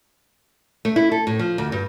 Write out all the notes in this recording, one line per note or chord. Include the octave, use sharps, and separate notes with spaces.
A3
E4
A4
A2
F3
D2
G2